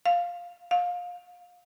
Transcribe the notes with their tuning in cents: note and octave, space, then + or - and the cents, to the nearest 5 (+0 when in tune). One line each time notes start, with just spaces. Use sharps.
F5 +0
F5 +25